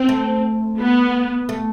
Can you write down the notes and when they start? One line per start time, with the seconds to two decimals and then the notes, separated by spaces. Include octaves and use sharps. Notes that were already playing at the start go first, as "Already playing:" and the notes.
Already playing: C4
0.09 A3
0.79 B3
1.49 A3